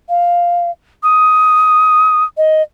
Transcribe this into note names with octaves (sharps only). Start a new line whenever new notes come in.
F5
D#6
D#5